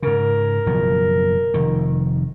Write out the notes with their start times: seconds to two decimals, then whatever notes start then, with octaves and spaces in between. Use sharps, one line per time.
0.03 G#2 C#3 A#4
0.66 F#1 B2 F3
1.54 F1 D#3